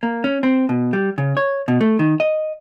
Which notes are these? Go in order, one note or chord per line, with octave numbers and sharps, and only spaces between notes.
A#3
C#4
C4
B2
G3
C#3
C#5
B2
A3
D#3
D#5